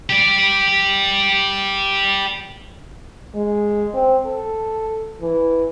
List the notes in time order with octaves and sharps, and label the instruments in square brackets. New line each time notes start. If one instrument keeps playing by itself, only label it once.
[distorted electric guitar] G4 D5
[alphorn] G#3
C4
A4
E3